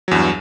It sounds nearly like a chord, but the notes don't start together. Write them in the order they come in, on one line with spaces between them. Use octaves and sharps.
F#3 E2 G2